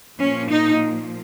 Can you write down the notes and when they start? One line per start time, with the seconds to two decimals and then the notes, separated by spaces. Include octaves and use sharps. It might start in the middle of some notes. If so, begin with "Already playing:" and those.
0.20 A#2 F3 A#3 C#4
0.50 D#4